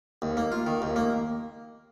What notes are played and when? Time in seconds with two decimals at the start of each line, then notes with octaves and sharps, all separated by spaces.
0.22 D#2
0.37 A#3
0.52 F4
0.67 D#3
0.82 D#2
0.96 A#3